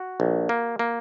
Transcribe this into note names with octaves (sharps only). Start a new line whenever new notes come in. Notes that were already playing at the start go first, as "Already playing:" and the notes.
Already playing: F#4
A#1
A#3
A#3